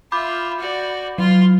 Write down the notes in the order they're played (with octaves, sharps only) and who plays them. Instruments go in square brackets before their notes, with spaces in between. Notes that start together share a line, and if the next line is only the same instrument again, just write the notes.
[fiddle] F4 E5 [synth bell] B5 D6 G6
[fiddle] F#4 D5
[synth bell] F#3 [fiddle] F4 C6